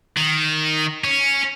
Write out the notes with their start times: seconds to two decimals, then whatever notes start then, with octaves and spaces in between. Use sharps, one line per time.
0.17 D#3
1.04 C#4